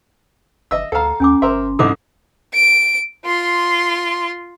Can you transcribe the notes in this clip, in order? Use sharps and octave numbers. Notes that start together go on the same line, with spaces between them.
F#1 D#5 E5 E6
D2 A4 F5 F#5 A#5
D#2 C#4 G#5 D6
G1 A#4 C5 E5 C6
C2 G#2 D#4 E4 A4 F#5 D6
D7
F4 C6